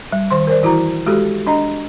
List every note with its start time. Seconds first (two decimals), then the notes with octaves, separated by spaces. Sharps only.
0.12 G3
0.31 D#3 C5 C6
0.47 A#4 C5 D5
0.63 E3 E4 F#4 A#5
1.06 G#3 F#4 G4 A4
1.47 D4 D#5 A#5